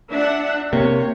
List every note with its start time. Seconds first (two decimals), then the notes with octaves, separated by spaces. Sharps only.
0.11 D4 E5 F#5
0.73 C3 A#3 C#5